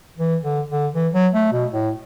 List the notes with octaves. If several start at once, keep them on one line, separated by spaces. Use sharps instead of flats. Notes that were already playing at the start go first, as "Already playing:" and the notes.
E3
D3
D3
E3
F#3
A3
B2
A2